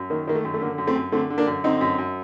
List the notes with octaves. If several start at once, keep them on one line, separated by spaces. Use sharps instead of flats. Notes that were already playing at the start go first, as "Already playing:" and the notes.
Already playing: F#2
D#3 A#3
D#3 A#3
A3
F#2
A3
D3 A#3
F#2
A3 C4
F#2
D3 A3 C4
D3
A#3 D4
F#2
D3 C4 D#4
F#2
F#2